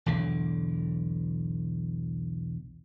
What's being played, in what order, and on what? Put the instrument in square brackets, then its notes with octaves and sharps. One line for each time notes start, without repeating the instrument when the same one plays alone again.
[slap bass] B1 E2 D3